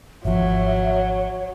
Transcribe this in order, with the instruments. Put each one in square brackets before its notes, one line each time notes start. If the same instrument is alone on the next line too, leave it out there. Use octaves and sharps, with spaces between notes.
[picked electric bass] G#1 F3 [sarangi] F#3 [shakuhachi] C#5 [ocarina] E5